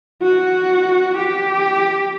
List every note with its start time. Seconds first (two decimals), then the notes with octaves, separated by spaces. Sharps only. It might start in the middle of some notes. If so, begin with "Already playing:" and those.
0.22 F#4
1.17 G4